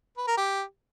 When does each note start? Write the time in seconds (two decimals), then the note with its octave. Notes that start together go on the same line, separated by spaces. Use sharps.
0.17 B4
0.27 A#4
0.37 G4